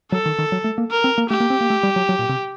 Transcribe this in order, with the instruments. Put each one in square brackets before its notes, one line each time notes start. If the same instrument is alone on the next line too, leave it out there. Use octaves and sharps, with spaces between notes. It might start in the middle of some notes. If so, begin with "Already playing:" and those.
[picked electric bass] F#3 [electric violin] A4
[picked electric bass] D#3
D#3
F#3
A3
A#3
[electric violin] A#4
[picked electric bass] C4
A#3
[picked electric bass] A3 [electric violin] G4
[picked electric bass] A#3
C4
A#3
A3
G3
F#3
F#3
A#2
C3